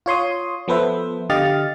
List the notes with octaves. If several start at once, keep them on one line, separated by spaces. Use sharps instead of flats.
F4 C#5 C6 D#6
F3 B3 A4 B4 C5 E5
D3 G4 D#5 F5 F6 A6